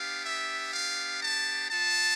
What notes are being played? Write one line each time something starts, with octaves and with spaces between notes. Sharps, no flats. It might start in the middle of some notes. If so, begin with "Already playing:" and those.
Already playing: B3 D4 G4 F5
E5
F5
A5
B3 F4 A5